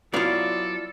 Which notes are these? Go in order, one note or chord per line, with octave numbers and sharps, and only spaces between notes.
F#3 B3 E4 F4 A4 D5 F5